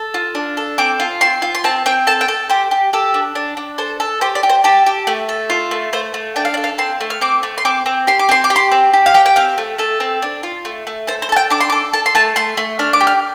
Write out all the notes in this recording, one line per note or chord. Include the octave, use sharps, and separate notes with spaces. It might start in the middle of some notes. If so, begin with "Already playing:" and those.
Already playing: A4
F4
D4
A4
C4 D6
F4
C4 C6
F4
C6
C4 A5
C4 G5
A4 A5
G5
A4
G4 C5
G4
G4 A4
D4
D4
D4
A4 C5
A4
G4 C5
D5
G4
C5
G4 A4
G4
A3
A4
F4
A3
A3 C5
A3
D4 G5
F5
D5
A4
F5
C4 C6
A3
F6
C4 D6
A3
C6
C4 D6
C4
G4 C6
D6
C4 C6
D6
G4
C6
C4
G4
F5
G4 G5
G5
C4 F5
A3
A3 A4
C4
D4
F4
A3
A3
A4 C5
C5
A4 A5
G5
D4 D6
C6
D6
A4
A4 A5
C6
A3 A5
A3 C6
A3
D4 F6
D6
G4
F6